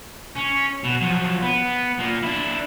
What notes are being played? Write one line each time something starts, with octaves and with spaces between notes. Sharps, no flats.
C#4
B2
F3 F#3
B3
A#2 A#3
D4 E4